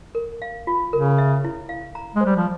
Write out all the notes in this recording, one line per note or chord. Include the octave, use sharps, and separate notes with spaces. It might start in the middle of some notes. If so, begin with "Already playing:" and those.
A#4
F5
F4
C#3 A#4
E5
E4
F5
A#5
G#3
G3 C5
F3